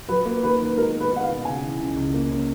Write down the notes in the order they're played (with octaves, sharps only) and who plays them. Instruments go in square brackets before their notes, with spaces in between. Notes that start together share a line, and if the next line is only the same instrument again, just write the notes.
[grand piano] F#3 [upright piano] B4
[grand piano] A#3
[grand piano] D#3 [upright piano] B4
[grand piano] D#3
[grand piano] G#3 [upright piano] A#4
[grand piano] B3
[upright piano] B4
[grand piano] D#4
[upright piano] F#5
F5
[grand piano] B2
[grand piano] C#3 [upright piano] G#5
[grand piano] E3
C#2
C#2
A#3
C#4